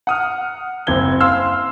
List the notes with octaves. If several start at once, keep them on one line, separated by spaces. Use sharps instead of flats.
F#5 D#6 F6
F#1 C4 G#6 G7
F5 C6 E6 F6